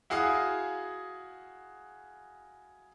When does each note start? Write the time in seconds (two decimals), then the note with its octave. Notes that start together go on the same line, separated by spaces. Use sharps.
0.10 E4 F#4 G#4 F5 D#6